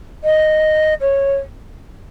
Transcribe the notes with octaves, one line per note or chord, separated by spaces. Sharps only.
D#5
C#5